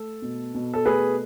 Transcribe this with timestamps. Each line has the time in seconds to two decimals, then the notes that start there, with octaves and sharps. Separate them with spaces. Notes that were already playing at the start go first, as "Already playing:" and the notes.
Already playing: A3 A4
0.22 B2
0.54 B2
0.74 A4
0.85 A3 G#4 B4